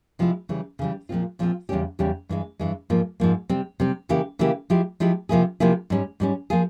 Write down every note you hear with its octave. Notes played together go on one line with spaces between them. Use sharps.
C3 F3 G#3 E4
C#3 E3 G3
C#3 E3 G3
A#2 F3 G#3 C4 F4
A#2 F3 G#3 C4 F4
E2 C#3 G3 C#4 G4
E2 C#3 G3 C#4 G4
G2 E3 G#3
G2 E3 G#3
G#2 F3 A#3
G#2 F3 A#3
C3 G3 C4
C3 G3 C4
C#3 E3 A#3 E4 G4
C#3 E3 A#3 E4 G4
F3 G#3 E4 G4
F3 G#3 E4 G4
C3 F3 A#3 E4 G#4
C3 F3 A#3 E4 G#4
G#2 G3 C#4
G#2 G3 C#4
F3 A#3 F4 G#4